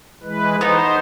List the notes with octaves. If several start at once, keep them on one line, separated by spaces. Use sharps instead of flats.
E3 G#3 B4
B3 D#4 C5